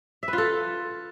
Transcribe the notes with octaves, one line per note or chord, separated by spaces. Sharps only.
E5
B4
F4
A4